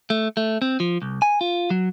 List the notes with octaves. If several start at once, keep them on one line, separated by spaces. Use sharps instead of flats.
A3
A3
C4
F3
C2
G#5
F4
F#3